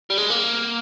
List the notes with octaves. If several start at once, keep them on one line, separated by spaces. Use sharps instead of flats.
G3
G#3
A#3